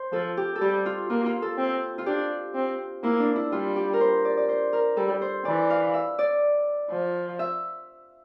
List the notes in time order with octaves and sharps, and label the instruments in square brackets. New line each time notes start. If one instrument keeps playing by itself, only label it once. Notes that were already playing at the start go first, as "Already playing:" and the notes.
Already playing: [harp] C5
[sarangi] F3 [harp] A4
[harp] G4
A4
[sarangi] G3 [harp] G4
[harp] F4
[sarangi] A#3 [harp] F4
[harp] F4
A4
[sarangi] C4
[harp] F4
[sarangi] D4 [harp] G4
[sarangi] C4
[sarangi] A#3 [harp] E4
[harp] D4
E4
[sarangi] G3 [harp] F4
[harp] G4
A#4
C5
D5
D5
C5
A#4
[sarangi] G3 [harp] A4
[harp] C5
[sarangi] E3 [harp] D5
[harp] F5
E5
D5
[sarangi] F3
[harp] E5